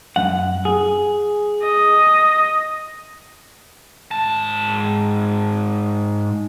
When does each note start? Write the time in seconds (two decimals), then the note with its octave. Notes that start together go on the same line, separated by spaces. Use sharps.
0.16 F#2 F#5
0.65 G#4
1.63 D#5
4.11 G#2 A5